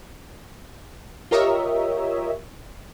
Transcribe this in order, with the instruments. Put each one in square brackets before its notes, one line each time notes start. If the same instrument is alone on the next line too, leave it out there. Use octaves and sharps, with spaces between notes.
[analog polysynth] F4 G4 A#4 C#5 D#5 E5